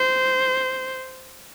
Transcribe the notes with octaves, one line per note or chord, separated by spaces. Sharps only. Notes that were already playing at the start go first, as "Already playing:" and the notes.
Already playing: C5